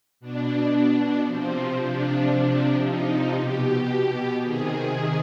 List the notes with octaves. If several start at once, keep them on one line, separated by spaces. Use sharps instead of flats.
B2 D4
C3 F3 C4
D4
C3 F3
D#4
B2 G4
C3 D#3 G#4